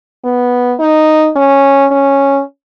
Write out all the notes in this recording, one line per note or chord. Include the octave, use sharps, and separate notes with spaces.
B3
D#4
C#4
C#4